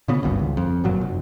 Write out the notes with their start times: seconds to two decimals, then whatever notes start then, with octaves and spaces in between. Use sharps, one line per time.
0.08 A#2 C#3 B3
0.23 G#1 D2 G2
0.39 C#2
0.57 F2
0.84 G1 F#2 A#2 F#3
1.01 F1